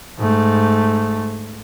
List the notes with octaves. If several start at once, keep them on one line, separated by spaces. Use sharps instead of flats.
G#2 A3